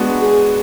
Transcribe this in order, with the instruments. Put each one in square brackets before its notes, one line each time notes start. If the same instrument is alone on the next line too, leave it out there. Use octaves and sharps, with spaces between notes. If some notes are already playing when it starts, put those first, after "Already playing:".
Already playing: [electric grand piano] G#3 B3 D4 F#4
[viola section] G#4